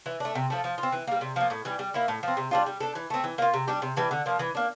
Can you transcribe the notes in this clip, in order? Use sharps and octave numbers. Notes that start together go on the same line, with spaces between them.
E3
A3 D4
C3
F3 A3
F3
F4
C4
E3
G3 A#3
C3
F3 A#3
A2
E3 G3
G3
A#3 E4
A2
F3 C4
C3
G3 D4 F4
G3
D4 A4
E3
A3 C4
E3
A#3 F4
C3
G3 D4 G4
C3
E3 G3 D4
D3
F3 A#3
E3
A#3 D4